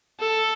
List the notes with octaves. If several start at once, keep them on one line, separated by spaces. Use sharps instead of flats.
A4